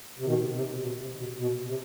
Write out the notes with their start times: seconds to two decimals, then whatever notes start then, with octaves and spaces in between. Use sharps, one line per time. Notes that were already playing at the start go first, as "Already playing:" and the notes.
0.19 C3
0.26 B2 D#3
0.53 C3
0.81 B2
1.00 C3
1.19 B2
1.39 B2
1.67 C3